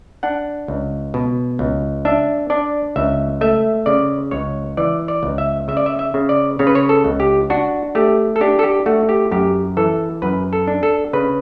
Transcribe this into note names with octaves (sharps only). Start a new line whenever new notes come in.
D4 F#5
C#2
B2
C#2
D4 E5
D4 D5
C#2 E5
A3 E5
C#3 D5
C#2 C#5
E3 D5
D5
C#2
E5
C#3 E5
D5
E5
E5
C#3
D5
C#3 C#5
B4
C#5
A4
C#2
G4
D4 F#4
A3 G4
A4
D4 G4
A4
G4
A3 F#4
G4
F#2 G4
E3 A4
F#2 B4
A4
D4
A4
C#3 B4